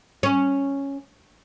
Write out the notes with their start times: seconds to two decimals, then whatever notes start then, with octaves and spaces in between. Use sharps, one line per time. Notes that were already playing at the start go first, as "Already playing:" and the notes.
0.23 C#4